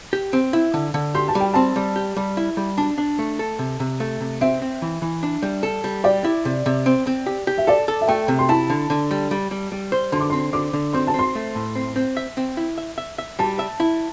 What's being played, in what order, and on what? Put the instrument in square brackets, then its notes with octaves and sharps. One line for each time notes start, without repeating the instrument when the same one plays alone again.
[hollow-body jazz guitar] G4
C4
E4
D3
D3
[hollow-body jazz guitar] G4 [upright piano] C6
[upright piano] A5
[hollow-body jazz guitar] G3
[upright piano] G5
[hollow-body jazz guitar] C4 [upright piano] A5
[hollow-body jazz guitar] G3
G4
G3
E4
G3
[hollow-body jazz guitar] D4 [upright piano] A5
[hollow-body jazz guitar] D4
A3
A4
C3
C3
A3
C3
[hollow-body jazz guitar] C4 [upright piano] E5
[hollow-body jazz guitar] C4
E3
E3
D4
G3
A4
G3
[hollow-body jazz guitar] G4 [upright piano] D5
[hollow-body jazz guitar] E4
C3
C3
C4
C4
G4
G4
[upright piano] E5
[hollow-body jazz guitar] A4 [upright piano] D5
[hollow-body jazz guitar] A4
[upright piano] E5
[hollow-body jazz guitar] A3 [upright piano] G5
[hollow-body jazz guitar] C3
[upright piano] C6
[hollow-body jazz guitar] E4 [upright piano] A5
[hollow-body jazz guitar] D3
D3
G3
G3
G3
G3
C5
[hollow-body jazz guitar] D3 [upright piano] C6
[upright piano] D6
[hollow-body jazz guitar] C4 [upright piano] C6
[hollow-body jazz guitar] D3 [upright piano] D6
[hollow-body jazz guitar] D3
[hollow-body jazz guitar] C4 [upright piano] C6
[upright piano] A5
[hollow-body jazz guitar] C4 [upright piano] C6
[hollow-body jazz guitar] A3
A2
C4
C4
E5
C4
E4
E5
E5
E5
[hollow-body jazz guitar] G3 [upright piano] A5
[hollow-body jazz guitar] E5
E4